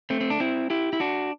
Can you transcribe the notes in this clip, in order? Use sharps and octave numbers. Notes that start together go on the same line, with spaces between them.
A3 C4
C4
D4
C4 E4
E4 G4
E4
D4 F#4